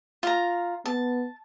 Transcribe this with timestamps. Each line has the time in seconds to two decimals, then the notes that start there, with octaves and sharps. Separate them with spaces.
0.23 F4 A#5
0.86 B3 A5